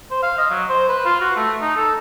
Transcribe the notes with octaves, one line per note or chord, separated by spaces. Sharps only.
C5
F5
D#5
F#3
C5
B4
F4
F#4
A3
D#4
A4